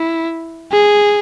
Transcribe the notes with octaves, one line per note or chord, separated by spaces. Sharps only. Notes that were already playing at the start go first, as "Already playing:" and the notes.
Already playing: E4
G#4